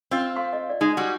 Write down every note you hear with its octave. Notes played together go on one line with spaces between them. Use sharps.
C4 F4
F5 C6
D#5
D5
G#3 D#4
G3 F#4